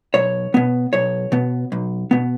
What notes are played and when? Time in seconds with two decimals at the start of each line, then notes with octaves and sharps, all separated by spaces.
0.14 B1 C#5
0.54 B2 B3
0.93 B1 C#5
1.32 B2 B3
1.72 B1
2.11 B2 B3